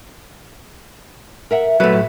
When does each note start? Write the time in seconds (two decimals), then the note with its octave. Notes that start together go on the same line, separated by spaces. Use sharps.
1.51 A#4 E5 F#5
1.80 A#2 F#3 G3 A3 B4
1.93 A2